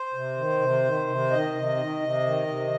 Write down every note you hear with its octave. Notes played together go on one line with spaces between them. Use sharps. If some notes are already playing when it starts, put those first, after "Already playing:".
Already playing: C5
C3
D#3
C3
D#3
C3
D#3 D#5
C3
D#3
C3
D#3
C3